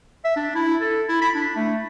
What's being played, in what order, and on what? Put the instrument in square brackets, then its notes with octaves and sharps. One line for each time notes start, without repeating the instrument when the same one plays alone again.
[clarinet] E5
D4
E4
A4
E4
B5
D4
A3